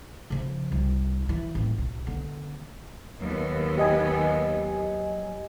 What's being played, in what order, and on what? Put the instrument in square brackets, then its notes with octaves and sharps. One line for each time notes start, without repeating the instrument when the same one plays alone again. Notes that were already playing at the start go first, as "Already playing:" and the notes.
[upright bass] C#3 F3
C2
E3 G3
D#1 A1
B1
D3 B3
[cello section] D#2 B3 [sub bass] F#3
[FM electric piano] G4 D#5 G#5